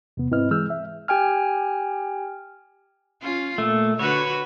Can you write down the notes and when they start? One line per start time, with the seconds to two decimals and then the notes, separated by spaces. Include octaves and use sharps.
0.17 E2 C3 B3
0.31 G#2 C4 E4 B4 D#5 F6
0.51 E3 G#3 G#4 E6 F6 G6
0.70 E5
1.08 G4 G5 G#5 F6
3.23 C#4 F4
3.58 A#2 A3
3.99 D3 F#4 B4 C#5